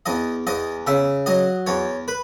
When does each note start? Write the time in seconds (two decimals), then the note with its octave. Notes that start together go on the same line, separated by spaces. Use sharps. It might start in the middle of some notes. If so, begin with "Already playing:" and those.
0.06 E2 D#5
0.47 E2 D#5
0.87 C#3 E5
1.26 F#3 D#5
1.67 E2 C#5
2.08 B4